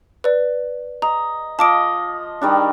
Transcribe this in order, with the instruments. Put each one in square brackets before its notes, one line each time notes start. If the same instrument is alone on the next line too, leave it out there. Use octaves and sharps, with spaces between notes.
[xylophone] B4 D5
[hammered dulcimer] D#5 [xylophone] A#5
[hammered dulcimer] F3 D#5 [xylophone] A5 D6 D7
[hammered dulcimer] D#3 G3 D4